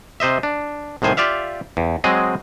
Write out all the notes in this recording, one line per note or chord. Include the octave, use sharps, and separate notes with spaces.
C3 C5 D#5 E5
D4
C2 A2 D#3 C5 G#5
F4 G4 D5 E5 F5
E2
F#3 G#3 C4 G#4 D#5